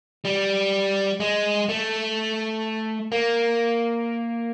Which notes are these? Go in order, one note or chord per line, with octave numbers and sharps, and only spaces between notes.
G3
G#3
A3
A#3